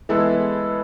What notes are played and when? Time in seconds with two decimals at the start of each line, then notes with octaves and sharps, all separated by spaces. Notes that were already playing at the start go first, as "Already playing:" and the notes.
0.09 E3 G#3 B3 E4 A4